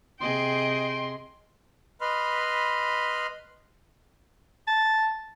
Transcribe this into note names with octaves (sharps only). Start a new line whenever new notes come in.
C3 G#4 D#5 G5 C6
B4 D#5 B5 C6 F6
A5